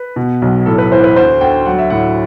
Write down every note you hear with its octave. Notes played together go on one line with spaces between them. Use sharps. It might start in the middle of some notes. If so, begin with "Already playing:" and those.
Already playing: B4
B2
B1
A2 A4
B4
E3 C5
B4
D2 C5
D2 G5
F#3 F#5
E5
A2 F#5